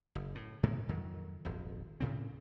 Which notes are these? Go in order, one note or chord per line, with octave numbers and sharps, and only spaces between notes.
F#1
A2
A2 C3 G#3 A#3
F2 D#3 F#3
D#1 G#1 F2
D2 A2 C#3 C4